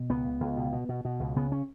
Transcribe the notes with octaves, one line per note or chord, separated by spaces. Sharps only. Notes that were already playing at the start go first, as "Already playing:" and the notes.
Already playing: B2
C#2 B3
C#2
C#2
B2
B2
B2
B2
C#2
C#3 B3
C#4